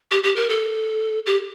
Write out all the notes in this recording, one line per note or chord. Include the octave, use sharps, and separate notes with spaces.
G4
G4
A#4
A4
G4